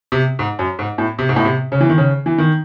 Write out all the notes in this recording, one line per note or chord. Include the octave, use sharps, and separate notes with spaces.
C3
G#2
F#2
G#2
A2
C3
G#2
A2
C3
C#3
E3
D#3
C#3
E3
D#3